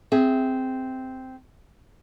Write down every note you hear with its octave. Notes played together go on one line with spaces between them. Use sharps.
C4 G#4 E5